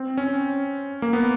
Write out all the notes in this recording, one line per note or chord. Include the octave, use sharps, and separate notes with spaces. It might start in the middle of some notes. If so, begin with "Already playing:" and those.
Already playing: C4
C#4
A#3
B3